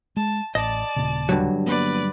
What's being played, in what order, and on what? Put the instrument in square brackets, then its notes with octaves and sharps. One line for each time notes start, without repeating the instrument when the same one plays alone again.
[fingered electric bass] G#3 [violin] A5
[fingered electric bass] A1 [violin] D5 A5 [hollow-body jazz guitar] D#5
[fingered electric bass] D#1 A#2 C#3
[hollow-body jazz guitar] G2 D3 F#3
[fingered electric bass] G3 A#3 B3 [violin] B4 D5